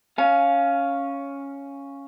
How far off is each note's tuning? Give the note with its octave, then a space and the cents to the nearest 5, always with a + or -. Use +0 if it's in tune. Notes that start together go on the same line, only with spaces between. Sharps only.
C#4 +0 F5 +0 G#5 +30